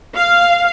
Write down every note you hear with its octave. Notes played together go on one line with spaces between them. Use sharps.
F5